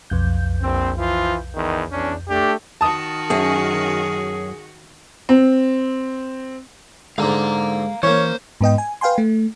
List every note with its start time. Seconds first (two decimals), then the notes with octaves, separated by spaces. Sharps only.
0.10 B1 F2 G6
0.61 A#1 C4
0.96 E3 F3 F4
1.54 E2 D#3
1.91 E2 C#4 D4
2.28 A3 D4 G4
2.81 D#3 F#4 A5 D#6
3.30 F#2 C#4 G#4
5.29 C4
7.18 G#2 D3 G#3 F5 A#5
8.03 E3 A#3 C#4 C5 C#5
8.61 G#2 B3 D#5 G5
8.78 G#5
9.01 B4 F5 G5 G#5 C6
9.18 A3